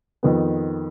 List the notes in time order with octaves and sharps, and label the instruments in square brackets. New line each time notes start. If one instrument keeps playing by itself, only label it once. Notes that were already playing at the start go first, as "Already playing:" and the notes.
[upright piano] F2 D#3 B3